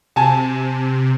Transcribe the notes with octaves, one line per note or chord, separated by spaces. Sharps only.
C3 G#5 A5